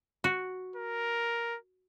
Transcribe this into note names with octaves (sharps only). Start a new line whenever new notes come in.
F#4
A#4